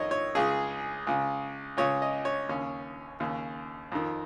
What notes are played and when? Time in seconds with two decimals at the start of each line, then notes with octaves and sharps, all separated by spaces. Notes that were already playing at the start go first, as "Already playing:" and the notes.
Already playing: F2 D#3 C#5 D#5
0.11 C#5
0.35 C#2 C#3 G#4
1.07 C#2 C#3
1.77 C#2 C#3 C#5
2.02 D#5
2.25 C#5
2.49 D#2 C#3 C#4
3.20 D#2 C#3
3.92 F2 D#3